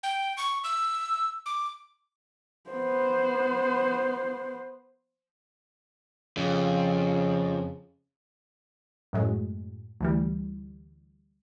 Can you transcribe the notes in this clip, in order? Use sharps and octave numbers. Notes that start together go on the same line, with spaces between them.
G5
C#6
E6
D6
B3 C5
F2 C#3
F#2 A2 F#3 G#3
D2 E3 G3